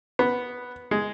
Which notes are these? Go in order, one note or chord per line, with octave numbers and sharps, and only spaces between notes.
B3
G#3